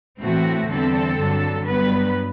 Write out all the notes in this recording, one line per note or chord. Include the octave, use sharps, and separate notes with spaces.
A2 E3 A3 C4 F#4
E2 D3 G3 C4 A4
G2 D3 F#3
G2 F#3 B3 B4